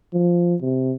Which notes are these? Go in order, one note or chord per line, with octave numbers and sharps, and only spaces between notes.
F3
C3